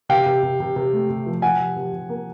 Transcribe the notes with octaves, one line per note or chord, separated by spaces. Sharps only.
C3 F5 G5
C3
C3
C3
C3
A3
C3
F3
F3 F#5 G#5
C3
C3
C3
A#3